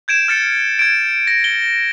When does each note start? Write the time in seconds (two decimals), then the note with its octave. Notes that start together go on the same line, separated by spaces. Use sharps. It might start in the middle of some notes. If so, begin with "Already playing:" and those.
0.08 G6 G#6 D7 E7
0.28 F6 A6 C#7
0.79 G#6 D7
1.27 A#6
1.44 G7